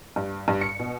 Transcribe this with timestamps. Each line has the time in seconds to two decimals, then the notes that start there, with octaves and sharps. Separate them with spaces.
0.16 G2
0.48 G2
0.61 C#7
0.79 B2